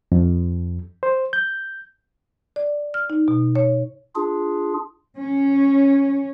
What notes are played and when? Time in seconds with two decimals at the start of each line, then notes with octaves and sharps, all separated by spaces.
0.12 F2
1.03 C5
1.33 G6
2.56 D5
2.94 F6
3.10 D#4
3.28 B2
3.56 C#5
4.15 D4 F4 G#4
5.18 C#4